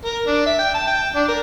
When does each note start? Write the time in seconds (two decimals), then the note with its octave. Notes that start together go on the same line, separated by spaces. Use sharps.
0.05 A#4
0.27 D4
0.46 E5
0.59 G5
0.74 A5
0.87 G5
1.15 D4
1.28 A#4